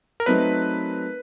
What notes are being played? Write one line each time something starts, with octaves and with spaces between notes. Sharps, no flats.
A#4
F#3 A3 C4 D#4 B4